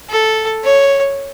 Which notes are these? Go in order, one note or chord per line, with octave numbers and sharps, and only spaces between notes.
A4
C#5